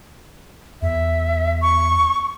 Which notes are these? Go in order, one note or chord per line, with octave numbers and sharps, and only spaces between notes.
E2 E5
C#6